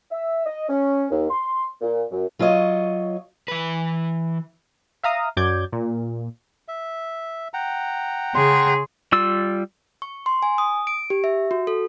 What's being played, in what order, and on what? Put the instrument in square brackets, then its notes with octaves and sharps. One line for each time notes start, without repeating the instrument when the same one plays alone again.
[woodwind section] E5
D#5
C#4
D#2
C6
A#2
F#2
[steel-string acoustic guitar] F#3 F4 C#5 D#5
[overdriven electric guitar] E3 B4
[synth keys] E5 F5 A#5 D#6
F#2 F#3 D5 D6 G6 G#6
A#2
[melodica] E5
F#5 G5 A#5
[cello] C#3 G#4 [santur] C6
[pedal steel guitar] G3 F4 E6
[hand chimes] C#6
C6
G#5
D#6
D7
G4
E5
F#4
A4